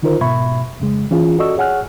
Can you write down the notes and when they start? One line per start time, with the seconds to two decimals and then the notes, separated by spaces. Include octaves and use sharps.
0.02 D3 D#3 D#4 F4 A#4 C5
0.21 G#2 B2 E5 B5 C#6 G#6
0.80 F2 C#3 G#3
1.11 E3 C#4 F4 G#4
1.38 F#4 A4 D5 D#5 C#6 E6
1.57 G#4 C#5 F#5 G#5 F6 F#6